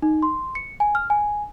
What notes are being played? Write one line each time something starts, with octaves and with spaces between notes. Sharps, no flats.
D#4
C6
C#7
G#5
F6
G#5